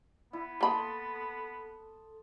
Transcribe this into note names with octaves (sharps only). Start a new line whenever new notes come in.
B3 E4
A#3 A4 A5 B5 C6 D#6